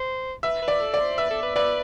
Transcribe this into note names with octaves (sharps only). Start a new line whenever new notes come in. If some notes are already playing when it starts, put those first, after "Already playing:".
Already playing: C5
B4 E5
B4
D5
A4
D5
C5
B4 E5
A4
B4
B4 D5